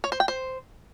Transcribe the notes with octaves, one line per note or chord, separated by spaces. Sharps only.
C#5
C5
G5
C5